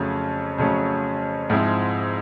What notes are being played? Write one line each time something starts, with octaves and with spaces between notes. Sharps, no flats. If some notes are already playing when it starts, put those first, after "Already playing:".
Already playing: F2 C#3 F#3 A3 C#4
F2 C#3 F#3 A3 C#4
G#2 F3 G#3 C4 E4